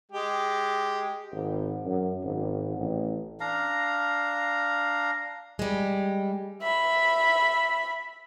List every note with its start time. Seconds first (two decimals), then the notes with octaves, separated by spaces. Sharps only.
0.12 G#3 G4
1.32 G#1
1.85 F#2
2.24 G#1
2.77 A1
3.40 D4 F5 A#5
5.59 G3 G#3
6.62 E5 B5